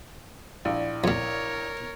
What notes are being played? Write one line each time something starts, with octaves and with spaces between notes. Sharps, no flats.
A#1 E4 D5 F5
F2 A#2 A#4 C#5